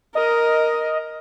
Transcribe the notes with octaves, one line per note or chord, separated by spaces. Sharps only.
A#4 D#5